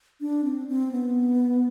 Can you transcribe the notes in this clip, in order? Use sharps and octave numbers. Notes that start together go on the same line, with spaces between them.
D4
C4
C4
B3